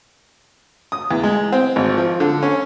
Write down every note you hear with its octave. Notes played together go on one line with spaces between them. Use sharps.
D#6
E2
G#3
C4
G#1
F3
D3
C#4